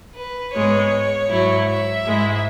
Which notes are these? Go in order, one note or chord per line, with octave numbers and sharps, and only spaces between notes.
B4
G#2 G#3 B3 C#5
G#2 F#3 E4
E5
G#2 G#3 E4